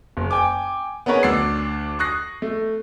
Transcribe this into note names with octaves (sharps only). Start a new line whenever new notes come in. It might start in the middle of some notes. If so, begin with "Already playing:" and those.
F#1
G5 G#5 D6
B3 C#4 G#4 A#4 B4 C#5
D2 D4 E6 C7
C#6 D#6 F#6 A#6 C7
A3